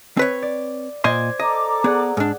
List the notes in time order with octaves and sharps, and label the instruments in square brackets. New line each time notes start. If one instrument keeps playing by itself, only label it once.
[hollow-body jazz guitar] C4 B4 C#5
[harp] D5
[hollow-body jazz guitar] A#2 D#5 C6 [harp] C5 D5 G#6
[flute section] A4 A#5 D6 [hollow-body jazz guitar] D#5
[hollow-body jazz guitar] B3 [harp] G#4 D5 F#5
[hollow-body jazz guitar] G#2 D4